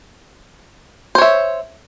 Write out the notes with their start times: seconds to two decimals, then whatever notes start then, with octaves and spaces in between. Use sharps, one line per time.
1.15 C5
1.18 C#5
1.22 E5